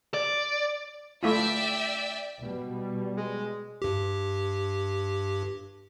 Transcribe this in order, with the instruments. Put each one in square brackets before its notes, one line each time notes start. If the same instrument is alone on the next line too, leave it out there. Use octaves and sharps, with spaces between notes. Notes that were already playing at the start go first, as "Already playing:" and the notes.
[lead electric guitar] D5
[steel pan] A3 E4 F4 [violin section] D5 E5 G5
[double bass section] B2 G3
[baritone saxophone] G#3
[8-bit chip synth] G2 G4